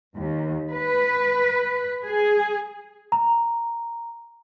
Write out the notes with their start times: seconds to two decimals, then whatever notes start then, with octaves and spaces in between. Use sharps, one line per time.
0.17 D#2
0.71 B4
2.05 G#4
3.12 A#5